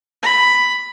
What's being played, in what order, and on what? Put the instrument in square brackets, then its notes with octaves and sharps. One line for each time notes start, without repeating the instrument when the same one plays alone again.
[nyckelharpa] B5